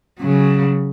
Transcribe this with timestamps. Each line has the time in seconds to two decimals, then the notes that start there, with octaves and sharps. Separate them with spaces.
0.19 C#3 F#3